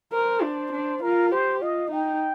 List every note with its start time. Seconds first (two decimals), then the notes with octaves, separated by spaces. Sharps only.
0.13 A#4 C5
0.42 D4
0.72 D4
1.02 F4 A#4
1.32 G4 C5
1.62 F4 D#5
1.91 D#4 G5